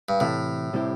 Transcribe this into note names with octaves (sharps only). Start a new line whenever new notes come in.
G2
A2 C3 E3 A3
C3 G3 C4 E4 G4